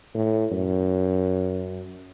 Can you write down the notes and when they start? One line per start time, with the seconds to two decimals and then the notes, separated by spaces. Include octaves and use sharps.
0.14 A2
0.51 F#2